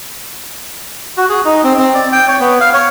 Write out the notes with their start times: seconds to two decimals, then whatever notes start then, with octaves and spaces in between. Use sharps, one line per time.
1.17 F#4
1.29 G#4
1.45 D#4
1.64 C4
1.78 C4
1.94 D5
2.12 G5
2.28 C#5
2.40 B3
2.61 F5
2.74 C#5